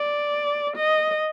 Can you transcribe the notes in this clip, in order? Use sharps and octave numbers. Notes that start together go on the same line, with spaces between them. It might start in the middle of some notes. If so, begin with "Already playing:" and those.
Already playing: D5
D#5